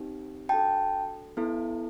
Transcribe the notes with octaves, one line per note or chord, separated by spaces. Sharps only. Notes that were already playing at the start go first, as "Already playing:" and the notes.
Already playing: C4 D#4 G4
D4 F#4 A4 G5 A5
B3 E4 A4